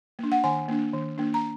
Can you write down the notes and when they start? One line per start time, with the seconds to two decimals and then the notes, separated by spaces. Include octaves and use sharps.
0.19 A#3 D4
0.32 F#5
0.44 D#3 G#5
0.68 A#3 D4
0.94 D#3
1.18 A#3 D4
1.34 A#5